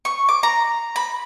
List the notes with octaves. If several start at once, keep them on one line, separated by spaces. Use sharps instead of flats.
C#6
D6
A#5
B5